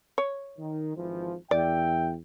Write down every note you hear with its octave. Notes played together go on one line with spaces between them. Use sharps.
C#5
D#3
G#1 E3 F3
E2 D5 E5 G5